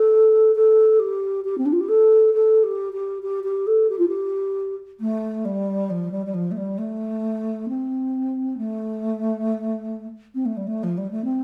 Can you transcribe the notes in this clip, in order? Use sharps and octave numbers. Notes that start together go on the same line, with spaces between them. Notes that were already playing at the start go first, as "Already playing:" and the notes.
Already playing: A4
A4
G4
G4
C4
D4
F4
G4
A4
A4
G4
G4
G4
G4
A4
G4
F4
G4
A3
G3
F3
G3
G3
F3
A3
G3
A3
C4
A3
C4
A3
G3
A3
F3
G3
A3
C4